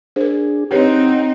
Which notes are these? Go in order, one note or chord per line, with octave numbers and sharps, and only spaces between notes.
D4 G#4 A#4 C5
C4 D#4 G4 B4 C#5 F#5 G5